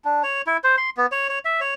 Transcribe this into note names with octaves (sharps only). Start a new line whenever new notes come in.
D4
C#5
E4
C5
C6
B3
C#5
C#5
E5
C#5